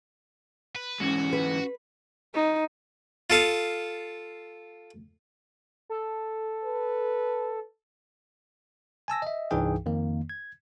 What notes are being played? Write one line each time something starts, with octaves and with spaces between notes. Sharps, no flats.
B4
G#2 E3 G#3 C#4 F#4
B4
D#4
F4 A4 F5 D#6
A4
B4
G#5 A5 E6 A#6
D#5 E5
C2 G2 E3 D#4 G#4 G5
F2 D#3 A#3
G#6